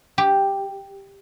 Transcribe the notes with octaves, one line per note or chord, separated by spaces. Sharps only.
G4